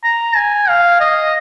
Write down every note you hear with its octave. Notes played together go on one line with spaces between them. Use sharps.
A#5
G#5
F5
D#5